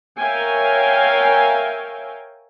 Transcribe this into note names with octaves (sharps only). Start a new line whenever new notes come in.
A#4 C#5 E5 F5 G5 G#5